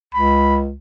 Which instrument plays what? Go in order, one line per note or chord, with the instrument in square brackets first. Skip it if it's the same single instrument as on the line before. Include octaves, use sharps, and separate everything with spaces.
[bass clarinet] C#2 [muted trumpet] B5